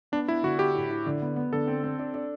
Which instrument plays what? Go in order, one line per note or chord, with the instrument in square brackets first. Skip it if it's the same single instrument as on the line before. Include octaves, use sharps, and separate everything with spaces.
[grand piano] B3 [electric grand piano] D4
[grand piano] B3 [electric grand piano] E4
[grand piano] D3 [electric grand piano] F#4
[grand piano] E4 [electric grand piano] G4
[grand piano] A2
E4
D3
B3
B3
[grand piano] D3 [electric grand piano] A4
[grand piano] C4
C4
D4
D4